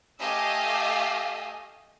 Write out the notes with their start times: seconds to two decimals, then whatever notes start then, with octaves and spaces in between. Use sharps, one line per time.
0.20 A3 G4 D#5 F5 G#5 E6